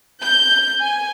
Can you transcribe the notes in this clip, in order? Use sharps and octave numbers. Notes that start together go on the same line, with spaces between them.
G6
G#5